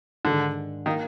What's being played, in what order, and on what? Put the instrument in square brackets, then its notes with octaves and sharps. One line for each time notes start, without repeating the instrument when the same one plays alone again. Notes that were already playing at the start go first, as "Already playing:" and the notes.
[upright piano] G#2 D#3 G#3 D4 [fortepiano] D3
[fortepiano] D#3 [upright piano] A#3 D#4 A#4 F5